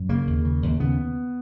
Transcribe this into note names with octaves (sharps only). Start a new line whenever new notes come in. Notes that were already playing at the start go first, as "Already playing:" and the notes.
Already playing: F#2
C#3 A#3
D#2
C#3
D#2
C#3 B3